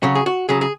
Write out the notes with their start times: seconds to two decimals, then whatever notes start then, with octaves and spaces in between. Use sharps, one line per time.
0.03 C#3 F#3 F#4
0.15 G#4
0.26 F#4
0.49 C#3 F#3 G#4
0.61 G#4